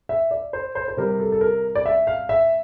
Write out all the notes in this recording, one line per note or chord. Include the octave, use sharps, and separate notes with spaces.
E5
D5
C5
C5
C5
C3 G3 A#4
A4
A4
A#4
D5
E5
F5
E5